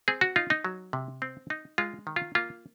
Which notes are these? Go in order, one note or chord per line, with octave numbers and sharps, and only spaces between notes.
C4 G#4
F#4
D#4 F4
D#4
F#3
C3
C4
D#4
G#3 F4
D#3
F4
A#3 F4